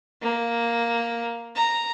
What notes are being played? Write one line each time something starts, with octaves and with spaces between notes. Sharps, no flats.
A#3
A#5